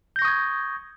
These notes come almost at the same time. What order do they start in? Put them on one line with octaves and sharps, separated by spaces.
G6 A#6 C#6 D#6 G#6